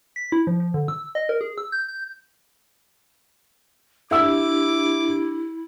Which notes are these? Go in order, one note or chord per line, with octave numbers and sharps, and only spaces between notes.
B6
E4
F3
F3
D3
E6
D#5
A#4
G#4
E6
G6
G6
D4 E4 G4 E5 D6 E6